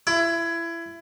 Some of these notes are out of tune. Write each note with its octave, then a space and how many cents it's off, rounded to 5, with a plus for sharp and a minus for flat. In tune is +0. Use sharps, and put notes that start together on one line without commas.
E4 +25